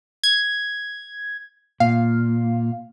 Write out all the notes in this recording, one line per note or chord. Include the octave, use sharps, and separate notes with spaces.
G#6
A#2 F5